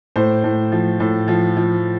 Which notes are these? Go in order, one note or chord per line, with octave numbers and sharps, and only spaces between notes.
A2 C5
A2
F3
A2
F3
F3